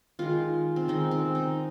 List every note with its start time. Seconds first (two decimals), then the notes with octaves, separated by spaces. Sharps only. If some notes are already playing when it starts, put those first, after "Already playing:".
0.19 D#3 G#3 F4
0.76 C4
0.88 D#3 G#3 D#4
1.11 C4
1.35 D#4